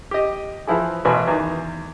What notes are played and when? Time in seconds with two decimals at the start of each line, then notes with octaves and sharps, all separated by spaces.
0.11 G4 D#5
0.67 E3 F3 E4 G#4
1.05 A1 B2 B4 G#5
1.28 E2 D#3